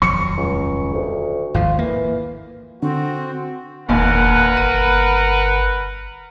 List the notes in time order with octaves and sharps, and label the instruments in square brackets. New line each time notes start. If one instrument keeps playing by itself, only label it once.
[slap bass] D#1 F2 F#3 [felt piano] C#6 C#7
[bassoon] C#2
D2
[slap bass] G#1 D#2 F3 [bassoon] F4
[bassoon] E3 [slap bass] A#3
[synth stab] D3 [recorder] C4 [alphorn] F#4
[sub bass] F1 [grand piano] A#1 D#2 A#2 [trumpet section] A#4 B4 F#5
[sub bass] G1 [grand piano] D#7